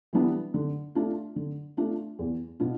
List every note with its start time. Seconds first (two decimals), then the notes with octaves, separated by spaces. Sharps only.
0.13 E3 G3 B3 D4
0.54 D3
0.95 A3 D4 F4
1.36 D3
1.77 A3 D4 F4
2.19 E2
2.60 B2 B3 D4 F4